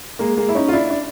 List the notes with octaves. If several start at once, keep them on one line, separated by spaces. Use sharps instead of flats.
G#3 A#3
G#3 A#3
E4
C#4 D#4
F4
D4 E4
D4